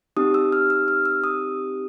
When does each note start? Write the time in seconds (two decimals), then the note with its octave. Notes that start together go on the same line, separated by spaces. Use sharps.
0.17 C4 D#4 G4 D#6
0.34 E6
0.52 F6
0.70 E6
0.88 F6
1.05 E6
1.24 D#6